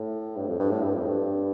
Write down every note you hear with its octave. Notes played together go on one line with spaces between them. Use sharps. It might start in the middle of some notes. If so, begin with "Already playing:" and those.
Already playing: A2
G2
F2
G2
A2
G2
F2
G2